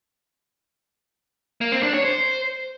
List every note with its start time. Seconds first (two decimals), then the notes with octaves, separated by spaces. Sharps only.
1.61 A#3
1.72 C4
1.83 D4
1.94 C#5
2.05 C5